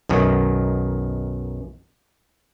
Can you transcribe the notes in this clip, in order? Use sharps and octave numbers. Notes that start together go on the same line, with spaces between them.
B1 F#2 D#3